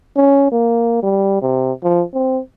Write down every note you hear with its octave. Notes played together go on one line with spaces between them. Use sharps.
C#4
A#3
G3
C3
F3
C4